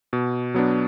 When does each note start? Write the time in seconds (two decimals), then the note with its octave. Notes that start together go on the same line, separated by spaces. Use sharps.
0.13 B2
0.54 F#3 B3 D4